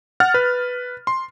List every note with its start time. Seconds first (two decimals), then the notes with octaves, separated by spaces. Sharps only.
0.20 F#5 F6 A6
0.34 B4
1.07 C6